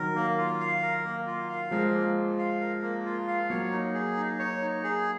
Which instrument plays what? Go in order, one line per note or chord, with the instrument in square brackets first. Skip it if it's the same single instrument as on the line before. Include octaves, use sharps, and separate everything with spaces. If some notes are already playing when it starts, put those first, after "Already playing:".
Already playing: [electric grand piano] D#3 F#3 [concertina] A#4
[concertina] A#3
F4
F5
A#4
A#3
F4
F5
[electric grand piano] F3 G#3 [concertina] A#4
[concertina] A#3
F4
F5
A#4
A#3
F4
F5
[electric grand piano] F#3 A#3 [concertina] C#5
[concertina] D#4
G#4
D#4
C#5
D#4
G#4